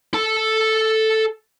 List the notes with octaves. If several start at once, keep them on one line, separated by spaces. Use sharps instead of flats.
A4 A5